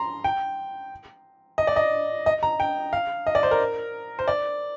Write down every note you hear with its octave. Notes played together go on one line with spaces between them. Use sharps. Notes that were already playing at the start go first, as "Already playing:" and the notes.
Already playing: A#5 C6
G5
D#5
D5
D#5
D#5
A#5
G5
F5
D#5
D5
C5
A#4
C5
D5